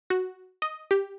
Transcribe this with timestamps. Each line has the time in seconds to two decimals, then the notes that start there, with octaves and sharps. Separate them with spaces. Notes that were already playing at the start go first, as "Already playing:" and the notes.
0.10 F#4
0.62 D#5
0.91 G4